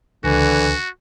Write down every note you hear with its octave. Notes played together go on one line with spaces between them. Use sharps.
C#2 D3 E3 F#4